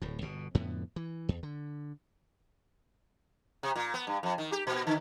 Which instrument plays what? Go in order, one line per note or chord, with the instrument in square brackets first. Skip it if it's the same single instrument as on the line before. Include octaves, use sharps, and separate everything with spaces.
[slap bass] D1 A2
G1 B2
F2 A2 D3 B3
E3
E2
D3
[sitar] C3
A#2
B3
G2
F2
D#3
G4
A#2
D3